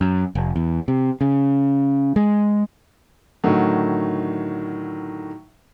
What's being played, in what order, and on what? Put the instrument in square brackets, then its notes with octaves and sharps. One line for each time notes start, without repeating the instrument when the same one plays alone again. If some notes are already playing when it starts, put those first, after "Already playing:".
[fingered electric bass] F#2
F1
E2
C3
C#3
G#3
[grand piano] A2 D3 D#3 F#3